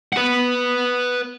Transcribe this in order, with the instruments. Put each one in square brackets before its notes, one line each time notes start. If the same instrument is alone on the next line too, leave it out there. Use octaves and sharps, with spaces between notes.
[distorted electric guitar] B4 F#5